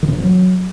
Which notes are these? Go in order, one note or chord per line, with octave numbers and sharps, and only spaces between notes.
D#3
C3
C#3
E3
F#3